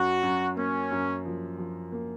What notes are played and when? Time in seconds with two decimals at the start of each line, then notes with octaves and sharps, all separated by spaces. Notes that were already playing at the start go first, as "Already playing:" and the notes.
Already playing: F#2 F#4
0.23 F#2
0.56 A#3 C#4
0.91 F#2
1.25 F3
1.58 F3
1.92 A#3